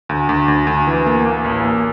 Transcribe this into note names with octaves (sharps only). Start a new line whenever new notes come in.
D2
D2
D2
D2
E3
A#3
A#3
A1
A#3